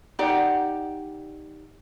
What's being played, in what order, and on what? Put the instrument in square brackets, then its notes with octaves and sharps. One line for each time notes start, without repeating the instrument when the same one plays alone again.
[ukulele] D#4 G4 D5 F#5